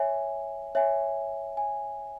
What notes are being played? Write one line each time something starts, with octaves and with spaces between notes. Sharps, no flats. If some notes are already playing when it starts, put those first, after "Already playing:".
Already playing: C#5 E5 G#5
C#5 E5 G#5
G#5